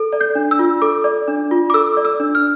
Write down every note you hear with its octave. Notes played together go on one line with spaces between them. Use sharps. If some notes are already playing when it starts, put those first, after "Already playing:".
Already playing: A4
D5
G6
D4
E6
F4
A4 D6
D5
D4
F4
D6
A4 E6
D5
E6
D4
F6